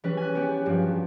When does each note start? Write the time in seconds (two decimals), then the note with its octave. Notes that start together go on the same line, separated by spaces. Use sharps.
0.04 E3 G3 C#4 B4
0.17 G#5 F#6
0.35 B3 G4
0.66 G2 F3 F#3